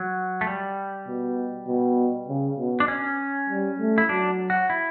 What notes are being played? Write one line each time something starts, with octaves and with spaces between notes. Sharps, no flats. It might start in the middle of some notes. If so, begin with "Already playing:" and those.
Already playing: F#3
A3
G3
B2
B2
C#3
B2
D4
C#4
G3
A3
E4
F#3 D4
F#4
E4